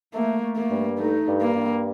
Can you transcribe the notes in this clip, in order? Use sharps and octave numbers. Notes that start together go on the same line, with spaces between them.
A3 A#3
A3
A#3
G2
A3 D#4
G2
A#3
G2